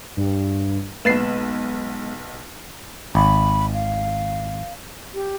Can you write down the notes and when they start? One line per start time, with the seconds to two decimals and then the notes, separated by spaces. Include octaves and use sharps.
0.17 G2
1.05 B1 G#3 A#3 B3 B4 A6 C7 E7
3.15 G#1 B5
3.73 F5
5.14 G4